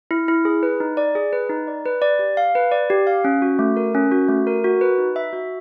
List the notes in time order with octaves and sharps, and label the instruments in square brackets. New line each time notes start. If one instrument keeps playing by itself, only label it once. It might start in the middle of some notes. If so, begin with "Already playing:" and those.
[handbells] E4
E4
G#4
B4
D#4
D5
G#4
B4
D#4
D5
B4
D5
G4
F5
B4
D5
G4
F5
C#4
F#4
A3
A#4
C#4
F#4
A3
A#4
F#4
B4
D#4
E5
F#4